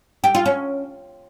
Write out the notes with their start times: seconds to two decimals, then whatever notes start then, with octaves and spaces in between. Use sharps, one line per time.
0.24 G4
0.35 F4
0.46 C#4